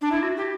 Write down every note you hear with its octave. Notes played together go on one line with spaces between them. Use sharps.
D4
E4
F#4
G4